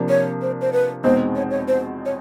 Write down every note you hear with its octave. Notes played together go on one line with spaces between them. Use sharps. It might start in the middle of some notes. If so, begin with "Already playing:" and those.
Already playing: C3 F3 A#3 D4
C#5
C5
C5
B4
E2 B2 G#3 C4 D#4 C5
C#5
C#5
C5
C#5